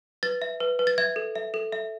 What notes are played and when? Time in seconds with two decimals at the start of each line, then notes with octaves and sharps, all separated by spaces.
0.23 B4 A6
0.42 E5
0.60 B4
0.79 B4
0.87 A6
0.98 E5 G#6
1.16 A4
1.35 E5
1.54 A4
1.73 E5